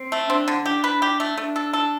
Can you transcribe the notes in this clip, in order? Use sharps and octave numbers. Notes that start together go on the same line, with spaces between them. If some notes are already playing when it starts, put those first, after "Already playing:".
Already playing: C4
A3
C4 D4
D3
D4 G4
B4
G4
A3
A3 D4
A4
A4